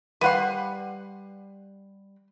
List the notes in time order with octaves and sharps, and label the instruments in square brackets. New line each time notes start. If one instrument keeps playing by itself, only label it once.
[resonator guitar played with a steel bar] G3 F5 F#5 [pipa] B4 C6